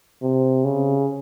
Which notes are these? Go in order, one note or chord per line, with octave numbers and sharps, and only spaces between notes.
C3
C#3